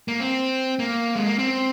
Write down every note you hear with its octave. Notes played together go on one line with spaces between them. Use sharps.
A#3
C4
A#3
G#3
A#3
C4